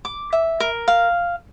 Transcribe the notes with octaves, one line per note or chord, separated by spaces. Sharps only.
D6
E5
A#4
F5